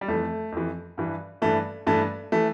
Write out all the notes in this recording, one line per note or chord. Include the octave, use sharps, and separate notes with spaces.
G3
F2 E3 A3
F2 E3
G2 E3
G2 E3 A3
G2 E3 A3
E3 A3